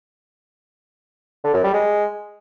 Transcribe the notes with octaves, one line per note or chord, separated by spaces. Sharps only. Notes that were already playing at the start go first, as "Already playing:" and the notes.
D3
F#2
G3
G#3